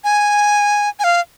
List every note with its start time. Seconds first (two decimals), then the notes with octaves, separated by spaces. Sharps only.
0.04 G#5
0.99 G#5
1.04 F5